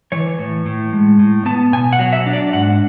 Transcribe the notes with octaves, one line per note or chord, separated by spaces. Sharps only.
E3 C#5
A2
A2
G#3
A2
B3 A5
B2 G#5
F#5
F#3
E5
D4
D5
G#2 F#5